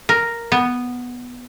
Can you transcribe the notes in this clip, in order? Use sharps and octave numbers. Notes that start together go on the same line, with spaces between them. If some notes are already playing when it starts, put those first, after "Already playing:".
A#4
B3